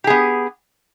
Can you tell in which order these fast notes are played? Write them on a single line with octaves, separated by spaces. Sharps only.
G4 G#4 B3